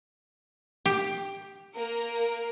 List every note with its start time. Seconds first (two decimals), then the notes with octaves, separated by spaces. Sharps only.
0.86 G4
1.74 A#3 A#4